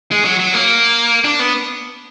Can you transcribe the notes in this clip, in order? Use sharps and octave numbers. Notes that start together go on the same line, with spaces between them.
G#3
F#3
F#3
A#3
D4
B3